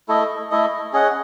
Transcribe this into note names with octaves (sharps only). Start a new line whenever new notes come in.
A3 E4 A4 D#5
A3 E4 A4 D#5
C#4 G#4 D#5 F#5